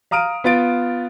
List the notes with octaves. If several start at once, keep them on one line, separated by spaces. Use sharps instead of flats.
F5 A#5 D#6 F6 D7 D#7
B3 F4 A6 D7